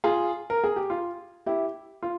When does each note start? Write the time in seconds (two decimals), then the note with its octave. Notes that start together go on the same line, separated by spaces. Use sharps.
0.04 F4 G#4
0.50 A#4
0.64 G#4
0.76 G4
0.90 F4
1.46 E4 G4
2.03 F4